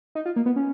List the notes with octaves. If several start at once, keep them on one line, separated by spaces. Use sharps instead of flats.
D#4
F4
A#3
B3
C#4